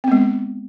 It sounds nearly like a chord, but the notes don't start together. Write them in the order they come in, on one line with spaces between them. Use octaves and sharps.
C4 B3 G#3